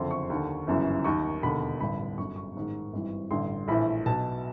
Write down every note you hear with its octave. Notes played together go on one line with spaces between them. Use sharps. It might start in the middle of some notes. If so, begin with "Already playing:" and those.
Already playing: F#1 F2 D3 C6
C#6
D#2 D3
G1 F#2 C#3 E3
D#2 D#3 C#6
E1 D#2 D3 B5
A1 G2 D3 B5
G1 F#2 D3 C#6
C#6
A1 G#2 D#3
G#1 G2 E3
A1 G2 D3 C6
A#1 A2 E3 B5
B1 B2 A5